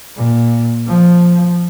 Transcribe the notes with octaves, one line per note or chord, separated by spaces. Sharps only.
A#2
F3